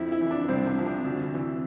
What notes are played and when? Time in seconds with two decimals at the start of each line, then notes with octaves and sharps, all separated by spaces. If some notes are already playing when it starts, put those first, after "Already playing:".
Already playing: F2 E4
0.12 E4
0.21 E3
0.31 D4
0.49 C2 C4
0.67 D4
0.76 C3 F3
0.86 D4
1.04 D2
1.32 C3 E3